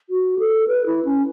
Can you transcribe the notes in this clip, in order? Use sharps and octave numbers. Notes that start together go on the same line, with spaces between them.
F#4
A4
B4
E4
C#4